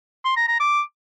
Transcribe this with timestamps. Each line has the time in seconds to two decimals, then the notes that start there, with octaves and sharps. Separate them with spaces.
0.25 C6
0.37 A#5
0.48 A#5
0.60 D6